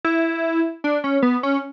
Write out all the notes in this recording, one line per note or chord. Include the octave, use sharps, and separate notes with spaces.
E4
D4
C#4
B3
C#4